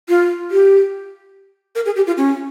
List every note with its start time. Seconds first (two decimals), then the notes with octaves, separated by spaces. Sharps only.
0.09 F4
0.51 G4
1.75 A#4
1.86 G#4
1.96 G4
2.07 F4
2.17 C#4